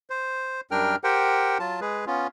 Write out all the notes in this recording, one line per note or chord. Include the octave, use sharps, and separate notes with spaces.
C5
F#2 G3 D4 A#4 G5 F6
G4 A#4 C5 F#5 G5
F#3 F4 A5
G#3 G#4 B4
B3 C#4 F4